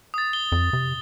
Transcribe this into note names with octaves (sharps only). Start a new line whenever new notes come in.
D#6 A6
G7
F2
C3